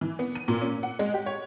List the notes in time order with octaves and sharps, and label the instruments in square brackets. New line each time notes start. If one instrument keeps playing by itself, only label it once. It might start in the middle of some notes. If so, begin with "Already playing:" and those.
[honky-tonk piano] E3
B3
D#7
A#2
C#4
F#5
G#3
G4
C#5